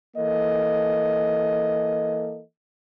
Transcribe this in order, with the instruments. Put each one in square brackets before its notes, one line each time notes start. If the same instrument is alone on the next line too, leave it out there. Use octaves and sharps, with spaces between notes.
[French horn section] E3 A#3 A4 D#5